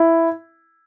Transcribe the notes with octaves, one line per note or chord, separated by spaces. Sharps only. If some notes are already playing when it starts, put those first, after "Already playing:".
Already playing: E4